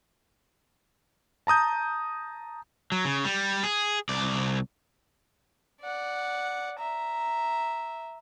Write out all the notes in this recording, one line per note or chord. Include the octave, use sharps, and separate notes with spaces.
A5 A#5 D#6 G6
F#3
C#3
G3
G#4
C2 D5
D5 F#5
E5 A#5